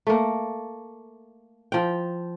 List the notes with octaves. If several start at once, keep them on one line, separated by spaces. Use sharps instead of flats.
A3 A#3
F3 G5